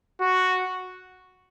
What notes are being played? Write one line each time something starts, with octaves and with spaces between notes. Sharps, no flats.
F#4